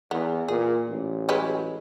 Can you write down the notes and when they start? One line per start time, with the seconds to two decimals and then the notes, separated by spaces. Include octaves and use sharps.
0.11 E2 B3
0.48 A#2 G#4
0.88 A1
1.29 F#3 G#3 B4